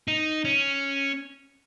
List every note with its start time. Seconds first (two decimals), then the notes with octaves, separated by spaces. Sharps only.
0.08 D#4
0.45 C#4